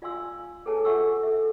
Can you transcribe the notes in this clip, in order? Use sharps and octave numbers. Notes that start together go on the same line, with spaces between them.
F4 D5 F5 G#5 C6 E6
G#4 A4 B4 C#5 G#5 A5
F4 A4 E5 F#5 C#6 E6
A4 E5